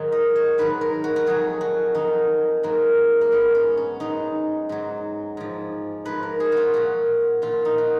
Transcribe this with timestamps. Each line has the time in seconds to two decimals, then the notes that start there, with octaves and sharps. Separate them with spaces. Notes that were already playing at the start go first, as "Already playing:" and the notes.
Already playing: G#2 D#3 F#3
0.12 D#5
0.36 C#5
0.58 G#2 D#3 F#3 B4
0.81 A#4
1.04 F#4
1.16 F#4
1.26 F2 D#3 F#3 G#4
1.61 F#4
1.95 F2 D#3 F#3 D#4
2.63 G#2 F#3 A#3
3.21 A#3
3.32 G#2 F#3 B3
3.55 C#4
3.77 C#4
4.00 G#2 F#3 D#4
4.69 G#2 F#3
5.37 G#2 F3
6.05 G#2 F3 B4
6.23 A#4
6.40 G#4
6.52 F4 F#4
6.74 A#2 F3 F#4
7.42 A#2 F3 F4
7.65 D#4
7.78 F#4